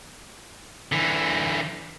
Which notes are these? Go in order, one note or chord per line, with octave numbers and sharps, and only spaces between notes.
D3 E3